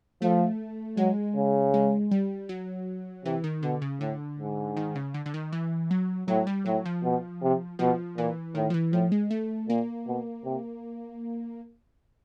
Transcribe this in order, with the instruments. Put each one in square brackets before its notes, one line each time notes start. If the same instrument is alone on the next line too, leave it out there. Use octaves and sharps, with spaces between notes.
[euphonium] F3 [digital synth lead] A3
[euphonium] F#3 [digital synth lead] G#3
[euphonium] C#3
[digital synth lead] G#3
G3
F#3
[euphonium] C3 [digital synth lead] E3
[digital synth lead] D#3
[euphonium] B2 [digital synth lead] D3
[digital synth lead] C#3
[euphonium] A2 [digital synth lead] D3
[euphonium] G#2
[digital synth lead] D#3
C#3
D3
D3
D#3
E3
F#3
[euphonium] A2 [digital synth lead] F#3
[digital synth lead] G3
[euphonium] A2 [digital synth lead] F#3
[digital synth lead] F3
[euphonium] B2
C3
[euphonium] B2 [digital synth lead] F3
[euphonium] A#2 [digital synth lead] E3
[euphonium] A2 [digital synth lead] D#3
[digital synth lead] F3
E3
[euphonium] A2 [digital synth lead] F3
[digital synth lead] G#3
A3
[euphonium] A#2 [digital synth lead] A#3
[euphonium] B2
C3